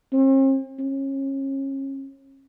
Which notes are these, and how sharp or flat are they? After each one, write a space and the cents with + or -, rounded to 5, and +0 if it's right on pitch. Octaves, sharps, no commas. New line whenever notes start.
C4 +45
C#4 -30